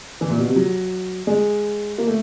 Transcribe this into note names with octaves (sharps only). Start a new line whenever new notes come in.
E3
A#2
B2
C3
F#3
G#3
A#3
A3